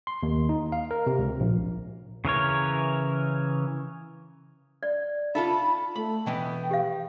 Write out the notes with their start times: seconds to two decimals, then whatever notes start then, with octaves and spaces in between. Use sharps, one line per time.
0.07 C6
0.23 D#2
0.49 D#4
0.72 F5
0.91 A#4
1.07 C3
1.18 C#2
1.40 A#1
2.25 C#3 E3 A#4 C#5
4.83 D5
5.35 D#4 F4 A4 E5 B5
5.96 A3 B5
6.26 B2 E3 B3 G5
6.71 G4 F5